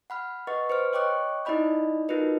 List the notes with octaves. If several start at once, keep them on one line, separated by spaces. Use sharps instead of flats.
F#5 B5 F6
B4 D#5 F#5 C#6 A6
B4 C5 F6
C#5 D#5 G5 C#6 D6 F#6
D#4 E4 D5 D#5 B5 G6
D#4 F4 F#4 A#4 B4 D#5